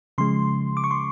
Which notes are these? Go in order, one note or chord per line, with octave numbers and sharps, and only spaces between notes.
C#3 F3 G#3 C6
D6
C#6
C6